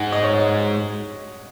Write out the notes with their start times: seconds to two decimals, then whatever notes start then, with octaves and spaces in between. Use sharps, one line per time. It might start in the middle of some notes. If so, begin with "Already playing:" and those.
Already playing: G#2 F#5
0.12 D#5
0.23 C#5
0.33 D#5